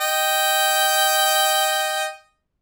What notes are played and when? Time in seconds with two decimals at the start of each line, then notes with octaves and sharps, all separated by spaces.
0.01 D#5 G5